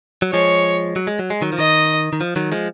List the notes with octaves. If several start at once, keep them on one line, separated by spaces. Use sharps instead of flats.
F#3
F3 G#3 C#5
F#3
G#3
F#3
G#3
D#3 F#3
F3
D#3 D#5
D#3
F3
D#3 F#3
F3 G#3